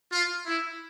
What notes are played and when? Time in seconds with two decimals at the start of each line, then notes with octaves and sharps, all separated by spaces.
0.12 F4
0.46 E4